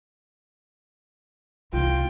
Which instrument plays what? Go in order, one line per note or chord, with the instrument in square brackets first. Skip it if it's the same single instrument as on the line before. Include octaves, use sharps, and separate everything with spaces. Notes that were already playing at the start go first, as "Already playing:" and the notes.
[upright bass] C2 [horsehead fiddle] F4 G5